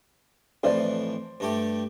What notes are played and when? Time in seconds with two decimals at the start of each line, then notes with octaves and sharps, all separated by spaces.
0.63 F2 A2 E3 C5 D5
1.40 G2 A3 G4